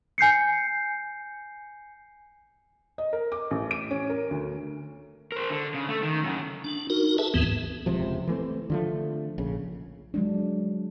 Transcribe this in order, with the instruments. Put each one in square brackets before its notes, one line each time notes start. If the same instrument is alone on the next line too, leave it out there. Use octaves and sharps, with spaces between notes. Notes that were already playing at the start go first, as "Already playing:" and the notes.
[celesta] G#5 G6 C7 C#7
[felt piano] D#5
A#4
D6
A1
D7
C#4
A#4
D2
[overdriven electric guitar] A#4 C5
D3
C#3
A3
D#3
F#2 C#3
[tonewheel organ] D4
D#4 F#4 A#4
G#4 A4 B4 E5 A5
D#2 G#2 E3 B3 C4
[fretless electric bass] E1 C#2 C3 F3
E3 A3 C4
D3 F3 A3
A#1 C#3
[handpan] F#3 G#3 D4